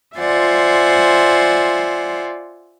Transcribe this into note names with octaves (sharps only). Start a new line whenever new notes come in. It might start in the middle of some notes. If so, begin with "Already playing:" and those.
F4 C5 D5 E5 F#5 G#5